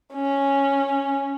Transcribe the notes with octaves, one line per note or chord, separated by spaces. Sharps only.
C#4